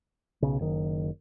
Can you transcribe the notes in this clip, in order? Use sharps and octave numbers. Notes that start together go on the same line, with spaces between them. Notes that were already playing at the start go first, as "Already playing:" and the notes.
B1 C#3
F#1 D#3